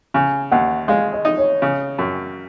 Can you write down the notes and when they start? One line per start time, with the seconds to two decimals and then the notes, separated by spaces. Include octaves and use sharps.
0.14 C#3 G#5
0.51 D#2 F#5
0.88 G#3 F5
1.13 D#5
1.25 D#4
1.37 C#5
1.62 C#3
1.98 F#2